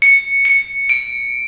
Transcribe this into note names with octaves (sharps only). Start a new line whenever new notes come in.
C#7
C#7
D7